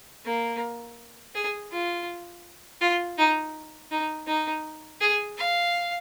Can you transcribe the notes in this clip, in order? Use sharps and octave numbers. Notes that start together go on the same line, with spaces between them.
A#3
G#4
F4
F4
D#4
D#4
D#4
G#4
F5